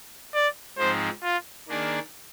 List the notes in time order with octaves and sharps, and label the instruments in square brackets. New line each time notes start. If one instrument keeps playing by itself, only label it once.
[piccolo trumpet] D5
[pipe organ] G#2 F3 G#3 C4 D#4 [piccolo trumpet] C5
[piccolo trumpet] F4
[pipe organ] D#3 A#3 D4 G#4 D5